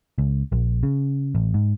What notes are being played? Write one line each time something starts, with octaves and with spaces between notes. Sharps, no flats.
C#2
A#1
C#3
A1
G#2